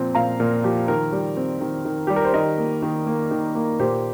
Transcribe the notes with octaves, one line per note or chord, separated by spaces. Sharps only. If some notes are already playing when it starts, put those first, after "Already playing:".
Already playing: A#2 F3 C4 G5
A#2 F5 A#5
A#2 A#4
F3 G4
D#3 A#4
G3
C4
D#3
D#3
G3 G4
A#4
C5
D#3 A#4 D#5
A#3
D#3
A#3
D#3
A#3
A#2 G4 C5